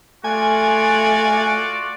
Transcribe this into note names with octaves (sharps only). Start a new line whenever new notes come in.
A3 F4 F#4 D5 G#5